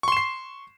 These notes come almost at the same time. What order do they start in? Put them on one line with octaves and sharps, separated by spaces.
C#6 C6 E7 C7